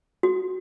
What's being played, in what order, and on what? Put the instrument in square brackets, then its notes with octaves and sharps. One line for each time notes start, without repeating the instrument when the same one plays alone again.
[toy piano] F#4